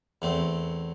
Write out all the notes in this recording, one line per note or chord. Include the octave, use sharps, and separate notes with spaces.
E2 A3 C4